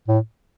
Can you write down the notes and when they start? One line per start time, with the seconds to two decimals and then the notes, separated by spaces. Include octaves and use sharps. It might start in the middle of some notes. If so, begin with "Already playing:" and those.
0.08 A2